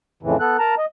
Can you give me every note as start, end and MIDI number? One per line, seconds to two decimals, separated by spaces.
0.23 0.37 41
0.23 0.37 45
0.23 0.37 49
0.23 0.37 52
0.40 0.57 59
0.40 0.57 69
0.40 0.57 90
0.59 0.75 70
0.59 0.75 81
0.59 0.75 82
0.78 0.86 75